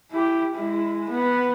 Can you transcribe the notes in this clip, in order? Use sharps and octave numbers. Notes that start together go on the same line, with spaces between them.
E4 G4
G#3 E4
B3